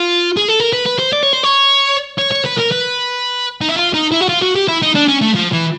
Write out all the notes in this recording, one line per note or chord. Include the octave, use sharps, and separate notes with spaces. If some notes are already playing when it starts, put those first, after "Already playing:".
Already playing: F4
G#4
A4
A#4
B4
B4
C5
D5
C#5
C5
C#5
C#5
C#5
B4
A#4
B4
D#4
E4
F4
D#4
E4
F#4
F4
F#4
G4
E4
D#4
D4
C#4
A3
F3
E3